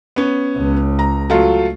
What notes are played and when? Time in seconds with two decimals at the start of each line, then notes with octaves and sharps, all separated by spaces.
0.16 B3 C#4
0.57 C#2
0.99 A#5
1.30 F#3 A3 F4